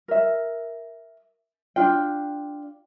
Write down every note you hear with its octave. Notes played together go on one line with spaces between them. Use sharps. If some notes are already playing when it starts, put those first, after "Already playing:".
A#4 E5
D4 F4 G5